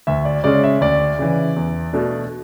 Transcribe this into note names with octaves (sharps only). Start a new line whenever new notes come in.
D2 E5
D5
C#3 G#3 C#4 D5
E5
D2 D5
C#3 E3
E2
B2 A3 D4